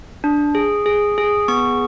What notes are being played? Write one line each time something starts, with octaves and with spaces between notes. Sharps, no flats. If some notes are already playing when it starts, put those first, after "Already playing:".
D4
G#4
G#4
G#4
B3 C#6